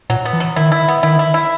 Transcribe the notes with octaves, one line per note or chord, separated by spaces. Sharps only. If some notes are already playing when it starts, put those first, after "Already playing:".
A#2 F#3
B3
E3
F#3
D#3 E4
E4
B3
D#3 E4
E4
E4